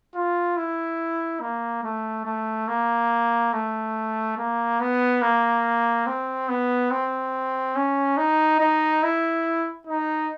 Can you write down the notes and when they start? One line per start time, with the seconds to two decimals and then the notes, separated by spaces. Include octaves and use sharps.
0.15 F4
0.57 E4
1.41 A#3
1.84 A3
2.25 A3
2.68 A#3
3.53 A3
4.38 A#3
4.80 B3
5.22 A#3
6.07 C4
6.49 B3
6.91 C4
7.76 C#4
8.17 D#4
8.60 D#4
9.03 E4
9.87 D#4